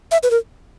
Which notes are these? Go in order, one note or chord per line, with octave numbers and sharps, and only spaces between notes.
E5
B4
A#4